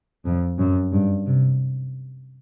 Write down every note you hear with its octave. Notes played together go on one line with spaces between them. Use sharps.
F2
F#2
G2
C3